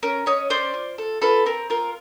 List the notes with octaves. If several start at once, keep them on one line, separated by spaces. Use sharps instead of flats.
C#4 A#4
C#4 C#5 D#5
C#4 C5 D5
F4
A4
F4 A4 B4
C4 A#4
F4 A#4